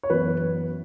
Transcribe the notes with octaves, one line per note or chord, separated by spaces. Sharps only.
C#5
F#2 E3 B3 B4